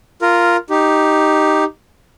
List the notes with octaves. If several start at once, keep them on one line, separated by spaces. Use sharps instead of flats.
F4 A#4
D#4 G4